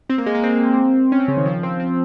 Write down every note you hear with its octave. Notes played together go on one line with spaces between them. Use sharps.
C4
A#3
G#3
A#3
C4
C#4
C4
C#3
D#3
F3
C4
C4